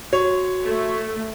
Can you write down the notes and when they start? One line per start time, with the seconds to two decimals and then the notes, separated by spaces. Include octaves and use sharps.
0.13 F#4 C#5
0.64 A3